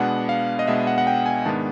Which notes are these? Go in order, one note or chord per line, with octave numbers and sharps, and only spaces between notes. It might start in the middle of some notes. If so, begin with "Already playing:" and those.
Already playing: B2 G#3 B3 D4 F#5
F5
D#5
B2 G#3 B3 D4 E5
F#5
F#5
G5
G#5
G#2 D#3 G#3 B3 D4 A5